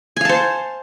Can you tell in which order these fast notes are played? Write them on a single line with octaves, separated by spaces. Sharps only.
G#5 F5 A5 C5